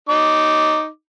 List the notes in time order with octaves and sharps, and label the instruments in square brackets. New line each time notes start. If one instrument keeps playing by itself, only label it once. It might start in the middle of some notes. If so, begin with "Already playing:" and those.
[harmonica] D#4 D6